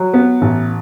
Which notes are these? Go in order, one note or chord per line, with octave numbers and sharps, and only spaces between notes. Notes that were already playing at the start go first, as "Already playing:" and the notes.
Already playing: F#3
B3
A1